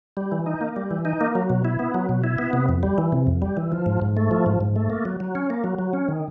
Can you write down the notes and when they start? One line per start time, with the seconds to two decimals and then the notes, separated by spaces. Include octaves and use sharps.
0.17 G3
0.32 E3
0.46 D#4
0.61 A#3
0.76 G3
0.91 E3
1.05 D#4
1.21 A#3
1.35 F#3
1.50 B2
1.65 E4
1.79 B3
1.94 F#3
2.09 B2
2.24 E4
2.38 B3
2.53 C3
2.69 F2
2.83 G3
2.98 E3
3.12 C3
3.27 F2
3.42 G3
3.57 E3
3.72 F3
3.86 G#2
4.02 G#2
4.17 A3
4.31 F3
4.46 G#2
4.60 G#2
4.76 A3
4.90 A#3
5.05 F#3
5.20 F#3
5.35 C#4
5.50 A#3
5.64 F#3
5.79 F#3
5.93 C#4
6.09 D#3